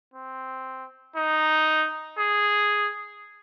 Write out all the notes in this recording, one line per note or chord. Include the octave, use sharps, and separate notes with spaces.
C4
D#4
G#4